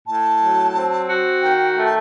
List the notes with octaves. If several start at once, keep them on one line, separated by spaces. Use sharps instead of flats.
A2 A5
F#3
C4
F#4
D#3 G5
G5
A3
A5